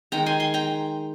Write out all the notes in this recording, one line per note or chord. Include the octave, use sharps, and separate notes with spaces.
D#3 G#3 G5 A#5
G#5 C6
G#5 C6
G5 A#5